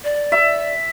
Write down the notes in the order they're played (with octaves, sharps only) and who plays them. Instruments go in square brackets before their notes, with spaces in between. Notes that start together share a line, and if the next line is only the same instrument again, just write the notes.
[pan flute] D5
[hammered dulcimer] E5